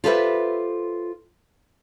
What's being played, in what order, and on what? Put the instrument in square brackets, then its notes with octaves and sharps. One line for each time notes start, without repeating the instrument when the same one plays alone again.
[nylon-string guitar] F4 G4 A4 B4 C5 E5